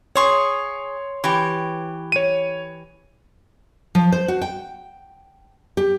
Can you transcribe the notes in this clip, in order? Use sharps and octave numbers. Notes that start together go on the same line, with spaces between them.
G#4 C#5 C6 C#6 D#6
E3 G4 C#6
C#5 D#7
F3
C5
F#4
G5
G4